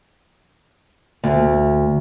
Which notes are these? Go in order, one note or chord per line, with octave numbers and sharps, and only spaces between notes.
D2